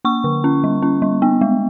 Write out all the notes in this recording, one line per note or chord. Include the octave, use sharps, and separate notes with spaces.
A#3 C#6
D3
C#4
G3
C#4
G3
B3
G#3